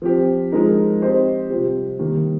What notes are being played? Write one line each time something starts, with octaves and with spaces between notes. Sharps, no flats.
F3 C4 G4
F3 G#3 D#4 A#4
C4 G4 C5 D#5
C3 G3 C4 F4
D#3 G3 A#3